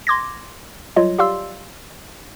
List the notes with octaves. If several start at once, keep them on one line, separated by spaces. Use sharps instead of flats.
C6 D6 G#6 A#6
F#3 G3 F4 C#5 D#5
G4 D5 F5 C6 E6